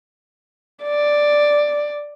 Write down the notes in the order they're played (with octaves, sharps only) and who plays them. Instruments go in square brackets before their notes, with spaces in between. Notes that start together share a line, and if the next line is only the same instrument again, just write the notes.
[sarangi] D5